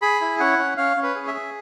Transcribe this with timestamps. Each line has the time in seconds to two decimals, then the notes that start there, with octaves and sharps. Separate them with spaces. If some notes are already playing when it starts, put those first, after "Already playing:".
0.02 G#4 B5
0.21 E4
0.40 C#4 F#5
0.59 C#4
0.77 C#4 F5
0.97 C#4
1.03 B4
1.15 G#4
1.27 E5
1.34 G#4